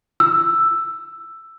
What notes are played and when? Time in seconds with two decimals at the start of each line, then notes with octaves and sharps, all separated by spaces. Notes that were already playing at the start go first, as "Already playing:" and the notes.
0.20 E6